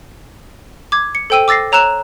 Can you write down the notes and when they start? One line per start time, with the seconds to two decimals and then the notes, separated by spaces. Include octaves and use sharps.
0.92 D6 G#6
1.15 C#7
1.30 A4 C5 G5 E6 D#7
1.48 D6 E6 A6 A#6 C7
1.72 C#5 A#5 E6 F#6 E7